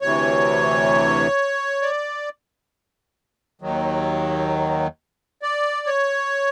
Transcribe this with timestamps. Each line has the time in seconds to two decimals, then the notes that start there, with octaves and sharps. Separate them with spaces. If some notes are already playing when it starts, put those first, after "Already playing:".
0.01 D2 C3 E3 C#5
1.82 D5
3.61 D#2 D#3 F#3
5.42 D5
5.87 C#5